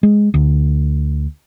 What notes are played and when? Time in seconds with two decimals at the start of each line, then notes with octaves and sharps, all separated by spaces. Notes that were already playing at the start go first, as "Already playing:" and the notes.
0.03 G#3
0.34 D2